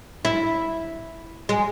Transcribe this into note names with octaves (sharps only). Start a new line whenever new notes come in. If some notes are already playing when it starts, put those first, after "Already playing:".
E4
G#3